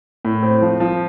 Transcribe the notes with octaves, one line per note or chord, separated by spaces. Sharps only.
A2
C4
F3
F3